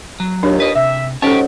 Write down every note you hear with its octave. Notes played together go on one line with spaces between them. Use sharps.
F#3
D#2 A#2 D4 A#4 C#5
B4 D#5
C3 E5
G#2 F#3 C#4 D#4 G4 A4 C#5